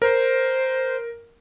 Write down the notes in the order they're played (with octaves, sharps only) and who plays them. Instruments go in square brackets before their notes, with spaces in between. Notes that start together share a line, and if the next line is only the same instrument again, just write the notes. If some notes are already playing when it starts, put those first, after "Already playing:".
[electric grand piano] A#4 [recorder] C5